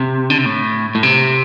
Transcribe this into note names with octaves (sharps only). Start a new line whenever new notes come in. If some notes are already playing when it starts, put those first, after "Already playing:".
Already playing: C3
D3
C3
A2
A2
C3